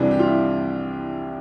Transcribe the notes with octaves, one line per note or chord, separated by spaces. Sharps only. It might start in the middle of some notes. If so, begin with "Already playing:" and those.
Already playing: C2 C3 E3 D4
G4
F4
E4